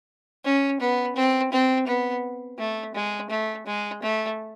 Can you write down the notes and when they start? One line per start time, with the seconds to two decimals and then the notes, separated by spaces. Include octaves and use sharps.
0.45 C#4
0.80 B3
1.16 C4
1.52 C4
1.87 B3
2.59 A3
2.95 G#3
3.30 A3
3.66 G#3
4.02 A3